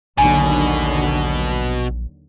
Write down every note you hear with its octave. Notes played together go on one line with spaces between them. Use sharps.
A#1 D#2 B2 D3 F#3 G#5